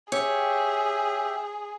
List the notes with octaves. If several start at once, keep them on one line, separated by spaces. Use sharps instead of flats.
G4 G#4 C#5 E5 G5